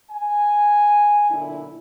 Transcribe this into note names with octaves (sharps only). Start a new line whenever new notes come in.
G#5
B1 A#2 D3 D4 E4